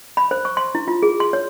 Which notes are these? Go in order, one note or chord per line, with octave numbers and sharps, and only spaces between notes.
B5
C5
C#6
C6
E4
F4
G#4
C6
C#5